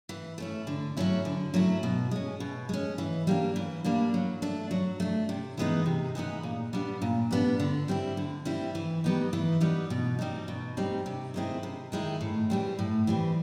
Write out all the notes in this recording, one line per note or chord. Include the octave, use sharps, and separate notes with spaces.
E3
A3 C#4 E4
D3
F#3 A3 C#4 E4
D3
F#3 A3 C#4 E4
B2
G#3 C#4
B2
G#3 C#4
E3
G3 A#3 D4
E3
G3 A#3 D4
F#3
A3 D4
F#3
A3 D4
C3
E3 G#3 B3 D#4
C3
E3 G#3 B3 D#4
A#2
G3 B3 D4
A#2
G3 B3 D4
D3
G3 C4 E4
D3
G3 C4 E4
E3
G3 B3 D#4
E3
G3 B3 D#4
B2
G3 C4 D#4
B2
G3 C4 D#4
C3
D#3 G#3 C4 E4
C3
D#3 G#3 C4 E4
A2
E3 G3 C4
A2
E3 G3 C4